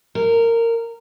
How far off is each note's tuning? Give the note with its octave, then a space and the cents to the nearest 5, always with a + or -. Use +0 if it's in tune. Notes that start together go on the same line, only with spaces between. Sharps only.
A#4 -15